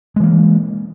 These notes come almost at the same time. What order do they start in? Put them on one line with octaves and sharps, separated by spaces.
G#3 E3 A#3